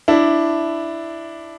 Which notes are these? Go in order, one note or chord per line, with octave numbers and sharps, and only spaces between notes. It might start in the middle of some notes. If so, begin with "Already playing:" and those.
D4 E4